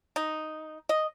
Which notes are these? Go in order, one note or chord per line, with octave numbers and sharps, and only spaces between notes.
D#4
D#5